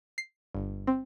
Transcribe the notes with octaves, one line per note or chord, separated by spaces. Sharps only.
C7
G1
C4